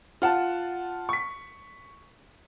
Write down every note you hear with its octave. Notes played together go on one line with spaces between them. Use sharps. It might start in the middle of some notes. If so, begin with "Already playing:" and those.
F4 F#5 A5
C#6 B6